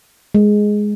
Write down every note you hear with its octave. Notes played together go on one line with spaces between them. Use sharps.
G#3